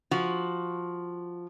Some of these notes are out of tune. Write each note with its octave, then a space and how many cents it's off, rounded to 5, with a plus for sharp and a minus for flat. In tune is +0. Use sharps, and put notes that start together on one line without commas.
F3 +0 F#4 +0